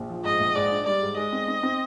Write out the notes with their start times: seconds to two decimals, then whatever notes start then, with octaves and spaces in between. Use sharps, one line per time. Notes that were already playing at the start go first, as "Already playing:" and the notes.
Already playing: A#1
0.09 F3
0.24 G#2 D#5
0.40 A#1
0.55 G#2 D5
0.71 D4
0.86 G3 D5
1.02 G#2
1.17 G#3 D#5
1.33 C4
1.48 C4
1.63 C4